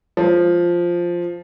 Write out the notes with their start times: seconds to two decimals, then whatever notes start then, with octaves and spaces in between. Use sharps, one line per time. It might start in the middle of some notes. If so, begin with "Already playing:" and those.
0.17 F3